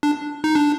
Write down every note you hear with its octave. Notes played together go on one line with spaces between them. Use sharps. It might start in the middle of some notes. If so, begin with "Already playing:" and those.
D4
D#4
D4